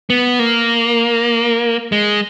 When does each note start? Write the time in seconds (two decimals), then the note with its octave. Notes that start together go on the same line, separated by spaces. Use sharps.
0.10 B3
0.39 A#3
1.92 G#3